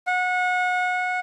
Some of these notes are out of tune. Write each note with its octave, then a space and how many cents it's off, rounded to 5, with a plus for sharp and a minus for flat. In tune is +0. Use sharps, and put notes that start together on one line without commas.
F#5 -25